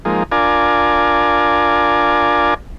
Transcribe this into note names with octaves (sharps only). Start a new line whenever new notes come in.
F3 G#3 A#3 D#4
D4 F4 A#4 D5 G#5